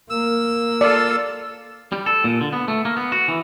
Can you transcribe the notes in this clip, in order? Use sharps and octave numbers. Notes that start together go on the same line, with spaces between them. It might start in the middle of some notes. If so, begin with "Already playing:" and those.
A#3 E6
F4 A4 D5
G3
A4
A#2
D3
B3
A3
A#3
B3
F#4
E3